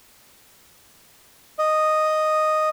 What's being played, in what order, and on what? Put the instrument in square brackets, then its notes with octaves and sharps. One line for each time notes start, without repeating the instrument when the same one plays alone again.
[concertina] D#5